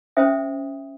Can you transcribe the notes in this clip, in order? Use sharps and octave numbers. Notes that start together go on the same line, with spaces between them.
C#4 C5 E5 G5 D#6